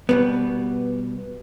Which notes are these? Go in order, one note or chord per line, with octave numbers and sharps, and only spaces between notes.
B2 G3 B3